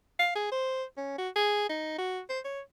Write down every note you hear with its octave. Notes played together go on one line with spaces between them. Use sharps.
F5
G#4
C5
C#4
F#4
G#4
D#4
F#4
C5
C#5